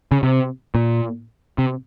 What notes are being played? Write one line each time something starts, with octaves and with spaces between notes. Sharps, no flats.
C#3
C3
A#2
C3